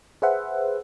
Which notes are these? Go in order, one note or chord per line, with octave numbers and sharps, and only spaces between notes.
G#4 B4 C5 E5 F#5